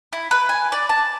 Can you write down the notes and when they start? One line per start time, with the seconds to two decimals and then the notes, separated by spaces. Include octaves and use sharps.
0.13 E4
0.31 B4
0.49 G#5
0.72 D5
0.89 A5